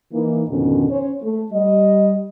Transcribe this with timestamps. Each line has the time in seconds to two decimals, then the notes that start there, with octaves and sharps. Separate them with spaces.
0.13 E3 A#3 D#4
0.49 F2 G#2 B2 D3 D#3 C#4
0.90 C#4 C5 C#5
1.23 A3
1.52 G3 D#5